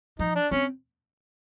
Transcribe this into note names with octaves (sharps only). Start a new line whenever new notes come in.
F3 D#4
D4
C4 C#4